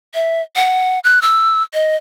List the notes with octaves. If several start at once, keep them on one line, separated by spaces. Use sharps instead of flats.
E5
F#5
F#6
E6
D#5